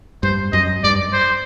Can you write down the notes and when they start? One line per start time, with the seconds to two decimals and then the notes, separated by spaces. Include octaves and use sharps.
0.23 G2 C5
0.53 F#2 D#5
0.84 G2 D5
1.13 C5